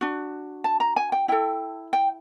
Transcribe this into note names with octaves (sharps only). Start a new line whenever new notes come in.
D4 F#4
A5
A#5
G#5
G5
E4 A4 G5
G5